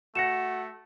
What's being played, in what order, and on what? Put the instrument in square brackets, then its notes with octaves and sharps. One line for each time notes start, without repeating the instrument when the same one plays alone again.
[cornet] A3 [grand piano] F#4 F#5 [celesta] A#6 C#7 E7